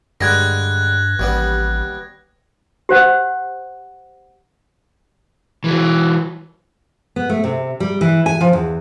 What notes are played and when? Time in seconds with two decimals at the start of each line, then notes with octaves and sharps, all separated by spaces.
0.21 G2 D3 G3 G#3 F#6 G#6 A#6
1.19 A1 D#2 G3 B3
2.89 G4 C5 F#5
5.64 E3 F#3
7.16 B3
7.30 A3
7.44 C3
7.80 G3
8.01 E3
8.26 G#5
8.41 F3
8.53 E2